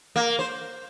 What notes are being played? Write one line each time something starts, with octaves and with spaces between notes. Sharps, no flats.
A#3
C5